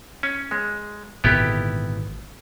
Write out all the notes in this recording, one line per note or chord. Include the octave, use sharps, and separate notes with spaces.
C#4
G#3
G#1 A#2 D3 B3 E4 G4